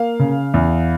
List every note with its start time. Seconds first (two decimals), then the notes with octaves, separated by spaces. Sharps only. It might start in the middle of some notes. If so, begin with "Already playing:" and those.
Already playing: A#3 F5
0.19 C#3
0.54 E2